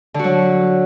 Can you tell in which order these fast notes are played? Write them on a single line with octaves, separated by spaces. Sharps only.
D3 F#4 F#3